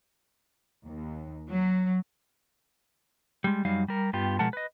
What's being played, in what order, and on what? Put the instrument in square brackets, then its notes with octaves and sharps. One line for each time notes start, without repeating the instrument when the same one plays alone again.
[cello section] D#2
F#3
[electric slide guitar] G3 G#3
F#2 F#3 G3 D#4 F5
G3 A#4
G2 B3 F4 G4
B2 F3 G#3 A#4 F#5 A5
B4 D#5